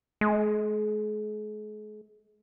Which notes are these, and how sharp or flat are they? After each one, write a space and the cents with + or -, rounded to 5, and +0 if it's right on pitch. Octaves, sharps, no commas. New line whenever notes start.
G#3 +40